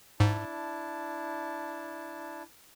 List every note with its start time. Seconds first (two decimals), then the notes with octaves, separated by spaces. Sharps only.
0.20 G#2 D4 E4 A5